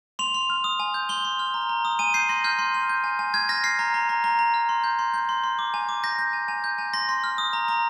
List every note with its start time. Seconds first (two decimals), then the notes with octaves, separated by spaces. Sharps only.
0.19 C6 F7
0.34 C6
0.50 F6
0.64 D#6
0.80 G#5
0.94 G6
1.09 C6 G7
1.25 C6
1.39 F6
1.54 A#5
1.69 A#5
1.85 D#6
1.99 G#5 D#7
2.14 G6 C7
2.29 C6 A#6
2.44 F6 G6
2.59 C6
2.74 F6
2.89 G6
3.04 G#5
3.19 G#5
3.34 F6 G#6
3.49 F6 A#6
3.64 F6 C7
3.79 A#5
3.94 A#5
4.09 A#5
4.24 A#5
4.39 A#5
4.54 F6
4.69 C6
4.84 G6
4.99 C6
5.14 G6
5.29 C6
5.44 C6
5.59 D6
5.74 G#5
5.89 D6
6.03 G6 A#6
6.19 G6
6.33 G#5
6.48 G#5
6.64 G6
6.78 G#5
6.94 C6 A#6
7.09 C6
7.24 F6
7.38 D#6
7.53 A#5
7.68 A#5